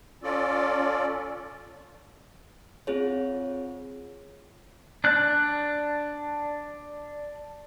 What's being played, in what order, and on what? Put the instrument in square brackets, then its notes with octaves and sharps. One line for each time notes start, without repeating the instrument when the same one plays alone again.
[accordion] C#4 F4 A4 D5
[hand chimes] C4 F4 G#4 C#5
[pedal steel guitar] D4 F#6